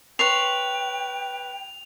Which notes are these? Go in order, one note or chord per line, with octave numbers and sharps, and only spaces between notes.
B4 C#5 G5 C6 F7